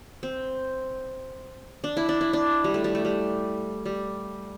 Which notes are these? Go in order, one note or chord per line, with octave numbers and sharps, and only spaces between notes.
C4
D4
E4
D4
E4
D4
G3
A3
G3
A3
G3
G3